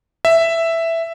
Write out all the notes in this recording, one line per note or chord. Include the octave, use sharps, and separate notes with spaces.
E5